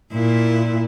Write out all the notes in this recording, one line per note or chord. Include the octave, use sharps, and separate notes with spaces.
A#2 E4